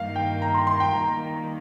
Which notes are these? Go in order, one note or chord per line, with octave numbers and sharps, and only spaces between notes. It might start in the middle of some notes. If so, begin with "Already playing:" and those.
Already playing: G2 D#3 A#3 F5
G5
A#5
C6
C6
G5
D#3 G3 A#3 A#5